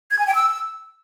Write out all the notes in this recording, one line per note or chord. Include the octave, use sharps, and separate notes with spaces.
G#6
G#5
G5
E6